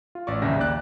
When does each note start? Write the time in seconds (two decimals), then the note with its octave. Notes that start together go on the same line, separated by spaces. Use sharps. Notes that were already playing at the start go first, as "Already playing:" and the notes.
0.15 F4
0.27 A1 D5 C#6
0.42 A#1 D#2 G#2 C#3 E5 A#6
0.58 A#1 D#2 D5 F#6